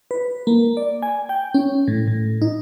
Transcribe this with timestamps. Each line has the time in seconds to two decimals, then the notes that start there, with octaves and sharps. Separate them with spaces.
0.11 B4
0.47 A#3
0.77 D5
1.02 G#5
1.29 G5
1.54 C#4
1.88 A2
2.08 A2
2.42 D#4